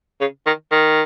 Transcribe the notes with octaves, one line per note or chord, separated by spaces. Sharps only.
C#3
D#3
D#3